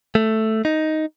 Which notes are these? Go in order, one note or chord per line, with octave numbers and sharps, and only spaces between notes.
A3
D#4